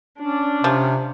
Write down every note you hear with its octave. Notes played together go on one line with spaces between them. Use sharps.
C#4 D4
C3 F3